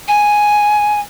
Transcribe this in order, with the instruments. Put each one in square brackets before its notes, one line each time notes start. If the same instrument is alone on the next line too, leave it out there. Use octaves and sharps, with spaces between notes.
[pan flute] G#5